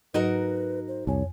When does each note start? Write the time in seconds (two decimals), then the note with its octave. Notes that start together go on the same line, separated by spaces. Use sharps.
0.14 G#2 F#3 D#4 F#4 A#4 B4
0.88 C5
1.07 C2 F2 C#5 G#5